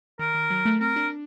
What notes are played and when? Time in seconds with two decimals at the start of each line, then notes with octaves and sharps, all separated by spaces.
0.19 D#3 A#4
0.35 D#3
0.50 F#3
0.65 A3
0.81 C4 A#4
0.96 D4